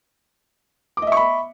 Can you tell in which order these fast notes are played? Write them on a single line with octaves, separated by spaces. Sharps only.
D6 D#5 E5 C#6 B5